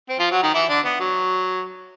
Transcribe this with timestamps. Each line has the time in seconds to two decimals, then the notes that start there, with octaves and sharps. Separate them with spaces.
0.09 C4
0.19 F3 F4
0.31 F#3 F#4
0.42 D#3 D#4
0.54 E3 E4
0.69 D3 D4
0.85 B3
1.00 F#3